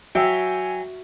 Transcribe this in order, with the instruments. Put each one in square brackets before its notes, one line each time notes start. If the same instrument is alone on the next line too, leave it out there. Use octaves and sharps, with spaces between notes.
[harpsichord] F#3 [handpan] F#4 E5 [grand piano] G5 E6 [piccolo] G#5